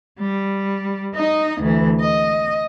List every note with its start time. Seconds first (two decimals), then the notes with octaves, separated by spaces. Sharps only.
0.20 G3
1.15 D#4 D#5
1.61 D2 E3
2.01 D#5